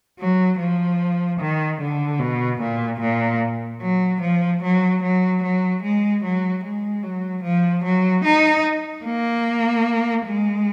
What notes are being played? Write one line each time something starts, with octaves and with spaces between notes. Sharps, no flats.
F#3
F3
D#3
D3
B2
A#2
A#2
F#3
F3
F#3
F#3
F#3
G#3
F#3
G#3
F#3
F3
F#3
D#4
A#3
G#3